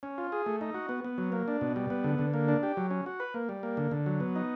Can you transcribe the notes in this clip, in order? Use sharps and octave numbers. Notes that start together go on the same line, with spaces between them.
C#4
F4
G#4
A3
D#4
F#4
B3
B3
F#3
A#3
D4
B2
G3
B3
D3
D3
A#3
D4
G4
F#3
C#4
F#4
B4
A#3
G3
A#3
D3
D3
F#3
B3
D#4